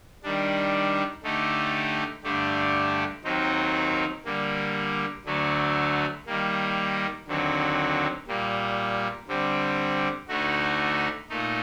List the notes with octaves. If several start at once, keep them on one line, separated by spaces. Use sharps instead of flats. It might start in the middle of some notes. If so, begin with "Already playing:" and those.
D#3 G3 D4
D3 A3 D#4 G4
G2 D3 A3 D4 G4
D#2 D#3 F#3 C4 D#4
D3 G3 A#3
D2 D3 F#3 A3
D#3 G3 A#3
D#2 D3 F#3 C4
A#2 G3 A#3
D3 G3 C4
D2 D3 A3 D#4 F#4
A#2 A3 D#4